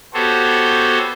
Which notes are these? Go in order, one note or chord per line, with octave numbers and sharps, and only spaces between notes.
B3 F#4 G4 A4 C5 C#5